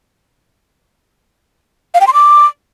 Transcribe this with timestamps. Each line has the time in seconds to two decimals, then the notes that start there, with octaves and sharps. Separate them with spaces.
1.94 F5
2.01 G5
2.07 C6
2.14 D6